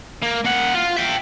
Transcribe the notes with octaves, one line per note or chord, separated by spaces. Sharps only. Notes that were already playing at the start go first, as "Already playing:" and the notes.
A#3
A#3 F#5
F4
E5 G5